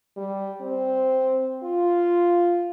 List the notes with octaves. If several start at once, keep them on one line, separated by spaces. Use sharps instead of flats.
G3
C4
F4